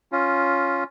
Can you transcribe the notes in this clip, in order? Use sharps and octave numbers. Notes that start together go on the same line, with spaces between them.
C#4 F4